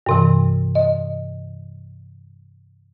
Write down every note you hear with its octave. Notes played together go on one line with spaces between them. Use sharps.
G2 C3 E3
D#5